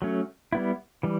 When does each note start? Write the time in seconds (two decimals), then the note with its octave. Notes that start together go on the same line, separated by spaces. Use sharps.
0.02 F#3 A3 C#4
0.52 G3 B3 E4
1.03 E3 G3